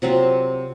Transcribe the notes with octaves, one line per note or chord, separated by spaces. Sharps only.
C3 F#3 C4 F4